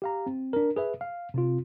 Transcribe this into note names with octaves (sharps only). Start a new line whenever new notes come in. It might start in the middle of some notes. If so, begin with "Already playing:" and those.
G4 F5 A#5
C4
D4 A#4
G#4 B4 E5
F5
C3 C4 F4